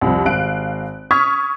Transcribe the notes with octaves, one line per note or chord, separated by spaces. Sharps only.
C2 F2
G#1 F5 F#6 D7
C#6 D#6 F6 G#6 B6